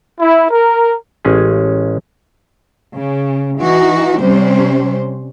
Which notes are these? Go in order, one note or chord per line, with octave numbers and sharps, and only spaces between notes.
E4
A#4
A1 G#3 C#4 G#4
C#3
E3 D#4 F#4
C3 G3 C#4 C5